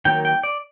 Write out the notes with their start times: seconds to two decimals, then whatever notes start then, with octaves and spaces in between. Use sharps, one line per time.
0.05 D#3 F#3 A#3 G5
0.25 G5
0.43 D5